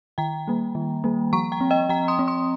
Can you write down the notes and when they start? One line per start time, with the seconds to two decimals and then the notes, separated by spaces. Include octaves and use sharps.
0.18 D#3 G5 A#5
0.47 G3 A#3
0.75 D#3
1.04 G3 A#3
1.33 F3 A#5 C#6
1.52 G5 A#5
1.61 C4
1.71 D#5 G5
1.89 F3 G5 A#5
2.08 C6 D#6
2.19 C4
2.28 C6 D#6